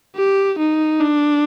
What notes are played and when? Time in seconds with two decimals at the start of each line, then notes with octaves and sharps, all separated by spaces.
0.16 G4
0.59 D#4
1.00 D4